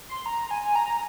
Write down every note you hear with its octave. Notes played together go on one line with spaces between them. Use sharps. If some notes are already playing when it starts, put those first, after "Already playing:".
C6
A#5
G#5
A#5